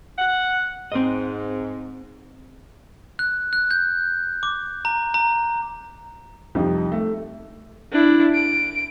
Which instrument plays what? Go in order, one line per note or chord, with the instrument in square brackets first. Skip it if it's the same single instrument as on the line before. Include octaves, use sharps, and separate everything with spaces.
[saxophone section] F#5
[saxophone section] G#2 [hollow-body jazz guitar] C4 D#5
[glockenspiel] F#6
F#6
G6
D6
A#5
A#5
[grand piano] F2 C3 F3 G3 D#4
A3
[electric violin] D4 E4
D7